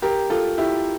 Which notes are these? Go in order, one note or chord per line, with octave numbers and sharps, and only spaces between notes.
G4 A#4
F4 A4
E4 G4